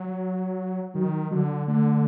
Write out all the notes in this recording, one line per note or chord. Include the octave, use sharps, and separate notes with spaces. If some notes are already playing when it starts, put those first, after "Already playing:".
Already playing: F#3
D#3 F#3
D3 F#3
D3 A3